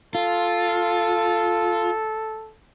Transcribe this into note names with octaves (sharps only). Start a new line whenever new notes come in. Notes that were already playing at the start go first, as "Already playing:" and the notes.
F4 A4